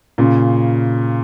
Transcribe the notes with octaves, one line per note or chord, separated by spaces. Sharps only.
A#2 C#3